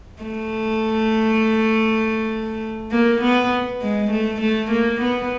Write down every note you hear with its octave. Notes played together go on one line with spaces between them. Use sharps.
A3
A#3
B3
G#3
A3
A3
A#3
B3